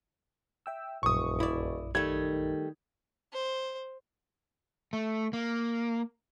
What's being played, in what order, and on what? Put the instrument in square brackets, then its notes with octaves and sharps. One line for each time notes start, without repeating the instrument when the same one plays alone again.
[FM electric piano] E5 G5 E6
[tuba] E1 [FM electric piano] A#1 F#2 [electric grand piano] C#6 D#6
[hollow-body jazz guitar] E4 D5
[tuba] D#3 [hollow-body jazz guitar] G3 A3 [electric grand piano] G#6
[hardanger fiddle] C5
[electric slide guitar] A3
A#3